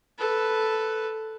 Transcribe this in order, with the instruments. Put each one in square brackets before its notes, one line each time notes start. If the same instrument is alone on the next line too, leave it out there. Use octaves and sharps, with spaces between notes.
[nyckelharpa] A4 B4